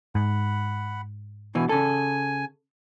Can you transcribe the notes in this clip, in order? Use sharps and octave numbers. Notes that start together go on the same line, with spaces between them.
G#2 F#5 B5
B2 E3 E4 G#5
C#3 A4 G#5